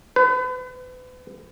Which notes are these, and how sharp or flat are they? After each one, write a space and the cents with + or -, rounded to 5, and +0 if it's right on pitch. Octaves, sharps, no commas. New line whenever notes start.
B4 +35